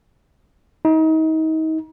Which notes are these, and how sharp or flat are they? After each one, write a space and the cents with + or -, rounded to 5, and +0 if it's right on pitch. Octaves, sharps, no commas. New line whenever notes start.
D#4 +35